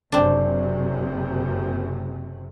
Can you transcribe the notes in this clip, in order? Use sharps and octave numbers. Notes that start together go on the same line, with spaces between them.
F#1 F#2 C3 C4 D4